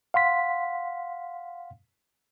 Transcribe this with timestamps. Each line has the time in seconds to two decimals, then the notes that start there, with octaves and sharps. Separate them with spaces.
0.14 F5 F#5 C6 B6